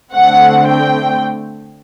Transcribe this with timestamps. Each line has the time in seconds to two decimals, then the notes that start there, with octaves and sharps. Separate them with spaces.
0.12 D3 A3 C4 F#5
0.67 G5